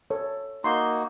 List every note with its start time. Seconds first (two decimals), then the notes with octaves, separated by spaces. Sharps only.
0.10 A4 C#5
0.64 A#3 D#4 F#4 C6